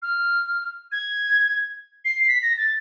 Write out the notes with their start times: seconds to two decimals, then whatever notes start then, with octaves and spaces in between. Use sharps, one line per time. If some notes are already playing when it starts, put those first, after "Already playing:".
0.02 F6
0.92 G#6
2.05 C7
2.28 B6
2.43 A#6
2.58 A6